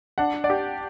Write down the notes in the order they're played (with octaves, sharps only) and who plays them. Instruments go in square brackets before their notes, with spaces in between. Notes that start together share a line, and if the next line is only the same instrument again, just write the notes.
[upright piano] D4 [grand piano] F#5
[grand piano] D5 F#5
[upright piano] G4